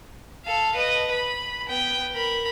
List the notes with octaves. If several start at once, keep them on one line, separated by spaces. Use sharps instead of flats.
A4 F5
B4 D#5
B5
B3 G5
A#4 B5